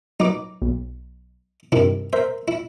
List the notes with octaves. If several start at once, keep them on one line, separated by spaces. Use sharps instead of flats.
F#3 D#4 B4 D6
B1
G2 C3 D#3 E4
A#4 C5 E5
E4